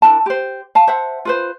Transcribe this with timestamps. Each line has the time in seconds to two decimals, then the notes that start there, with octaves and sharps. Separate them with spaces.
0.02 D4 E4 A#4 A5
0.26 G4 C5
0.75 F5 A5
0.87 C5 E5 F#5
1.25 F4 B4 C5